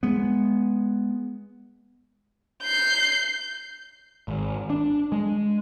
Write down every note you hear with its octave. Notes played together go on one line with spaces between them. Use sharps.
G#3 B3
G6 C7
G#1
D4
G#3